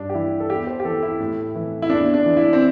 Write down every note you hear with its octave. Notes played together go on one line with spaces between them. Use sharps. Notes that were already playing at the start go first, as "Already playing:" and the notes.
Already playing: G2 D4
G4
E3 E4
A4
E2 G4
C5
G4
E3 A4
E4
A2
E3
E4
E2 D4
D4
E3
E4
C4